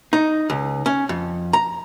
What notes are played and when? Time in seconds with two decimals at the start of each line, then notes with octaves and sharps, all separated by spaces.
0.13 D#4
0.50 C#2
0.86 C#4
1.09 F2
1.53 A#5